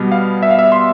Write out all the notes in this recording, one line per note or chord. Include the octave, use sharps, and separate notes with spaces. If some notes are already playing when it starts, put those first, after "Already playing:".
Already playing: B2 G3 B3
F5
E5
F5
E5
C6